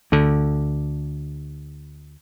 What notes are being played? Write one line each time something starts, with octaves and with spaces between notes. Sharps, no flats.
D2 D3